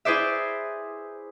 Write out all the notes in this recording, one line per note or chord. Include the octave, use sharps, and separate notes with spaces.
E4 G#4 B4 C5 D5 E5